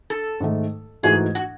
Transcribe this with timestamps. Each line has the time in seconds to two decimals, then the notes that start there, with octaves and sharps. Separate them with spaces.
0.10 A4
0.40 G#2 D#3 A3
1.03 G#2 E3 A3 D#4 F#4 G#4
1.35 F#4